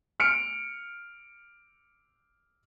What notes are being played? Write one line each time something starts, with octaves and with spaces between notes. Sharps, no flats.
F6 C#7 D7